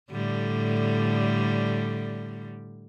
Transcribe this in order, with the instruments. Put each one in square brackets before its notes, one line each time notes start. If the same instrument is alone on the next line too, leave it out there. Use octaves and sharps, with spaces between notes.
[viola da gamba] A2 D3 G3